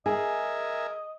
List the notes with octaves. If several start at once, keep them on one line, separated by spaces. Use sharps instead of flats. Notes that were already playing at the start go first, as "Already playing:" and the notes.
G#4 A#4 D#5 E5 G#5